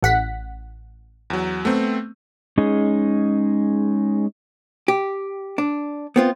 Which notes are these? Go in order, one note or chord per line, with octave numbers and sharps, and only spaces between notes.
A1 F#5 B6
E2 F#3
A3 B3 C4
G#3 C#4 D#4 G#4
G4
D4
B3 C4 F4